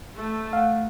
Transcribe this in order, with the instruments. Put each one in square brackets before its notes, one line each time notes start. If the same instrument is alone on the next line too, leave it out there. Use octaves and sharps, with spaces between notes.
[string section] A3
[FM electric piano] F5 F#5